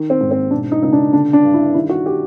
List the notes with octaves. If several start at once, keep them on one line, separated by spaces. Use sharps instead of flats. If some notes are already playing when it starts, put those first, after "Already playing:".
Already playing: D#3
C4
G#2
C4
B2 D4
D#4
C#2 D#4
D4
D3 D4
D4
G2
E4
D#3 E4
F#4
G4